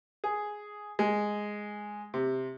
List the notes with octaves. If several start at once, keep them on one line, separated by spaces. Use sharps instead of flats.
G#4
G#3
C3